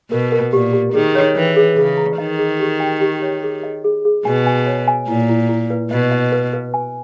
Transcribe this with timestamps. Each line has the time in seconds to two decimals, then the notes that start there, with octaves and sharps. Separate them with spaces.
0.12 B2 A#4
0.32 A#4
0.53 A#2 G4
0.73 G4
0.94 D#3 G#4
1.15 C#5
1.36 E3 G5
1.56 G#4
1.77 C#3 G#4
1.98 A#5
2.18 D#3 D#5
2.39 G#4
2.60 G4
2.80 G5
3.01 G4
3.22 C#5
3.43 G#4
3.63 D#5
3.84 G#4
4.05 G#4
4.25 B2 G#5
4.47 G#5
4.66 C#5
4.88 G#5
5.08 A#2 E4
5.29 E4
5.49 E4
5.70 B4
5.91 B2 D#5
6.11 D#5
6.32 B4
6.53 B4
6.74 G#5